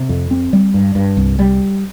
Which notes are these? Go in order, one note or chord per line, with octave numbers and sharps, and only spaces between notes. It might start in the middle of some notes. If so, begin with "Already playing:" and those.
Already playing: C3
F2
C4
G3
G2
G2
C2
G3